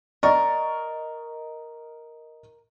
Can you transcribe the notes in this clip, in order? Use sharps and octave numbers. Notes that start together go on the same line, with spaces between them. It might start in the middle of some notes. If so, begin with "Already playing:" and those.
A#4 D5 D#5 C#6 A6